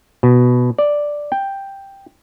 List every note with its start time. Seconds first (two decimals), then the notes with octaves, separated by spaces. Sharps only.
0.23 B2
0.79 D5
1.32 G5